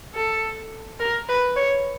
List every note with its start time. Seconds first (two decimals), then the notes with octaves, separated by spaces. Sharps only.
0.15 A4
1.00 A#4
1.28 B4
1.56 C#5